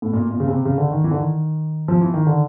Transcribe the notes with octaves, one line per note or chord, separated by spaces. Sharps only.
A2
A#2
A#2
C#3
C3
C#3
D3
D#3
E3
D3
D#3
F3
E3
D#3
D3